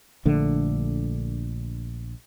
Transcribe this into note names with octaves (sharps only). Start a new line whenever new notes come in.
A#1 D3 A3